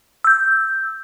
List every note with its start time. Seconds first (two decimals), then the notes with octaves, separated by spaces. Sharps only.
0.24 E6 G6